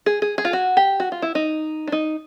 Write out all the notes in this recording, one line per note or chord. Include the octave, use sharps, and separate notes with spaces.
G#4
G#4
G#4
F4
F#4
G4
F#4
F4
E4
D#4
D4
D#4